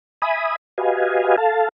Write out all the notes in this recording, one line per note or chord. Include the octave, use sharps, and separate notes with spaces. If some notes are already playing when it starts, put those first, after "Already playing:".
E5 G#5 B5 D#6
F#4 G4 B4 D#5 F5 G#5
A4 F5 A5